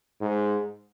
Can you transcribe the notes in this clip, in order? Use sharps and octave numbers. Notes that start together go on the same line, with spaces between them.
G#2